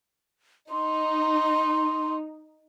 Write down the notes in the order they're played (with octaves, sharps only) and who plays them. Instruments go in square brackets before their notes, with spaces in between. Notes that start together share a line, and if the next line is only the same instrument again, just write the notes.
[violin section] D#4 [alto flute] C6